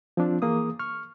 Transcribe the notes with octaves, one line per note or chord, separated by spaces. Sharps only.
F3 C4 D4 F4
E3 A#3 G#4 D#6
C#6 F6